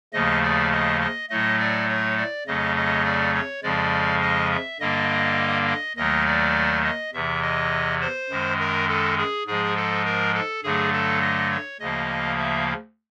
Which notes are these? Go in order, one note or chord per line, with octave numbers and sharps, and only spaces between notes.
D#2 C#3 F3 A3 D#5
D5
D#5
D#5
A2 F#3 A3 D#5
D5
C#5
D5
F2 C#3 F#3 A3 D#5
D#5
D5
C#5
F2 C#3 F3 G#3 D5
D#5
E5
G2 D3 G3 A#3 D#5
D#5
D#2 D#3 F#3 A3 D#5
D5
D#5
E2 C3 E3 E5
D#5
C5
F#2 D#3 G#3
A#4
A4
G#4
G#2 F3 G#3 G#4
A4
A#4
A4
G2 D3 F#3 A3 G#4
A4
D#5
C#5
D2 C#3 F3 A#3 D#5
E5